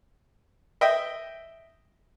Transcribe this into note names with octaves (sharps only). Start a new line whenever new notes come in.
D#5 E5 G5